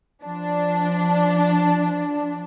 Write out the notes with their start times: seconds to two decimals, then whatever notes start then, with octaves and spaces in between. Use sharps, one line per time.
0.22 F3 D4